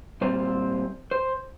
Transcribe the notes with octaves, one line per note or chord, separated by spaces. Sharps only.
A#2 G3 C4 C5
C5